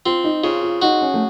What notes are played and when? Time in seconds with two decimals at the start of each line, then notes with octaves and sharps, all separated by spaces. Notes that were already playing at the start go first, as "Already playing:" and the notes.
0.05 C4 F4
0.24 D#4
0.43 C#3 F4
0.63 F4
0.82 D#4 F#4
1.01 C#4
1.14 A3